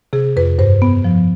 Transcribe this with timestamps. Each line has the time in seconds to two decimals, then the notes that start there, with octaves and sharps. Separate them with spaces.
0.13 C3 G#4
0.36 F2 B4
0.59 G2 C5
0.82 B3
1.04 F3